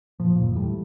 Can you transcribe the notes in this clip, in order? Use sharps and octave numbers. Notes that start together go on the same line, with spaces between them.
A#2 F3
F#1 D#2 A#2
A2 E3 G3 A3